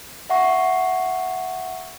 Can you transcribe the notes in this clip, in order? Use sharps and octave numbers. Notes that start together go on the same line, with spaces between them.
E5 F#5 C#6